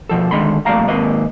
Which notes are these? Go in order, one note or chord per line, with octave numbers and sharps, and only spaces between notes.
B2 F3 A4
D3 D#3 G#3 B5 C6
F2 A#2 G3 A3 F5 A#5
D#2 G#2 C3 A#3 B4 D#5